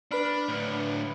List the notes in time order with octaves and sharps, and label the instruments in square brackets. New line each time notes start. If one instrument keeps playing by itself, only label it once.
[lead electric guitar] D4 [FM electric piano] B4 B5 F6
[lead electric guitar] A2 D3